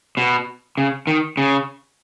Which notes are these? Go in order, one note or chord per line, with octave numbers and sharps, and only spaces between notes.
B2
C#3
D#3
C#3